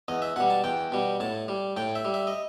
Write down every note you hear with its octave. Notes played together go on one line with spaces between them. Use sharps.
E2 D#5
E5
B2 G3 F#5
A5
E2 G5
B2 G3
A2 A5
G3
A2 G5
E5
G3
E5
D#5